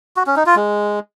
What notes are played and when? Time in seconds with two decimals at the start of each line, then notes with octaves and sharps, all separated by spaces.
0.17 F#4
0.26 C#4
0.36 D#4
0.46 F4
0.56 G#3